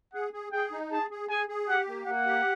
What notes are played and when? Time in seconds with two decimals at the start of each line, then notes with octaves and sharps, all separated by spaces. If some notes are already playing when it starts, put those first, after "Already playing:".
0.14 G#4 F#5
0.33 G#4
0.52 G#4 G5
0.72 D#4
0.91 G#4 A5
1.11 G#4
1.30 G#4 G#5
1.49 G#4
1.68 G4 F#5
1.88 A#3
2.07 A#3 F#5
2.26 G4